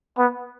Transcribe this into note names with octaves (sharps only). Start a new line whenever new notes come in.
B3